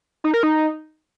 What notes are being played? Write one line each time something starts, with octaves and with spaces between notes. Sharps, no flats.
D#4
A#4
D#4